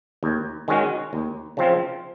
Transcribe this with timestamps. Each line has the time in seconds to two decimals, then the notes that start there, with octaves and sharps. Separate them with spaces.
0.23 D#2
0.68 D#3 G#3 C#4 F#4
1.13 D#2
1.57 C#3 F3 C4 F4